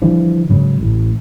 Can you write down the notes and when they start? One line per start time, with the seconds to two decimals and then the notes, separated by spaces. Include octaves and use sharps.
0.02 D3 E3 F3 G3
0.49 G#2 C#3 F#3
0.81 A1